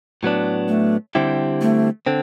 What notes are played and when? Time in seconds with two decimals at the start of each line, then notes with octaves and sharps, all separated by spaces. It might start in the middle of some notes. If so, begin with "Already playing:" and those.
0.23 A2 F#3 B3 D4
0.68 A3
1.15 D3 G3 C4 E4 G4
1.61 A3
2.07 D3 C4